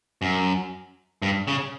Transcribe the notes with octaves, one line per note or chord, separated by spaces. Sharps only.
F#2
G2
C#3